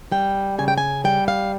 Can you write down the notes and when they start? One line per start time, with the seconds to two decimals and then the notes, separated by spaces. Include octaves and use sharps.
0.12 G3 G5
0.58 C#3 G#5
0.68 G5
0.78 G#5
1.04 G3 G5
1.28 F5